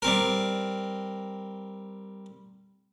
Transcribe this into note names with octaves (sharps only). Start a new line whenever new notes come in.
G3 C4 A#4